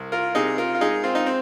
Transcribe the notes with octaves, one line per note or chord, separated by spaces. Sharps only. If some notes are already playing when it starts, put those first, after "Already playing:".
Already playing: C2
F4 A#4
C3 D#4 G#4
F4 A#4
F4
G#3 D#4 G#4
C4 F4
D#4
C4